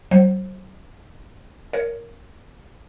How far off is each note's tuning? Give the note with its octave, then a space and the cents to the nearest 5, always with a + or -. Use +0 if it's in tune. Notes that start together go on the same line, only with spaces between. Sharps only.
F#3 +35 C5 +30
A#4 +0 C#5 +15